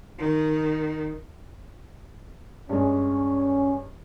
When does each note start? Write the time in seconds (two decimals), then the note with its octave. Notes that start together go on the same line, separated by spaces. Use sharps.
0.18 D#3
2.69 G2 G#3 C#4